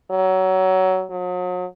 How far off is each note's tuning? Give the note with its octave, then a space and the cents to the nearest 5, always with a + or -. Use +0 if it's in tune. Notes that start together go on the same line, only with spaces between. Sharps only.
F#3 +20
F#3 -40